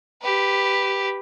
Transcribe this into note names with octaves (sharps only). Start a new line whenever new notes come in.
G4 B4